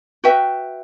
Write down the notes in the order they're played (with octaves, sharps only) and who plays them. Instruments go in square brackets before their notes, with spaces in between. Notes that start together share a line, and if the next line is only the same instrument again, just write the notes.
[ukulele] F#4 B4 E5 G5